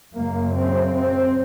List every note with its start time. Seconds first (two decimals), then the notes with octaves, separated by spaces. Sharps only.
0.13 F#2 C#3 A#3
0.54 C4
0.95 C4